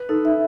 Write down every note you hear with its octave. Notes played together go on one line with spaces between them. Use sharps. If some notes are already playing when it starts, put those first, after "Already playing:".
Already playing: B4
D#4 A4
E5